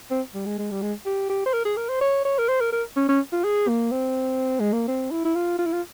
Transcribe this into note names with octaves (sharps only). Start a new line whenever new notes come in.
C4
G3
G#3
G#3
G3
G#3
G4
G4
C5
A#4
G#4
A#4
C5
C#5
C#5
A#4
C5
A#4
A#4
C#4
C#4
F4
G#4
A#3
C4
G#3
A#3
C4
E4
E4
F4
F4
E4
F4